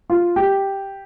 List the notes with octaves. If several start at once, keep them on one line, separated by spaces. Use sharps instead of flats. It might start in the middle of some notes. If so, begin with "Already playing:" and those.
F4
G4